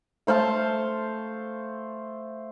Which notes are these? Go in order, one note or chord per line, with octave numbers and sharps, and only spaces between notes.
A3 C5 F5 A5